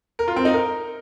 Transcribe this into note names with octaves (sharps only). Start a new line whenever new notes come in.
A#4
F4
C4
D#4
A#4